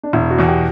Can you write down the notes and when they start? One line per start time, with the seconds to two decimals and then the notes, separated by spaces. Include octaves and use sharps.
0.03 D4
0.13 E1 E4
0.30 F#4
0.38 E2 B2
0.47 G4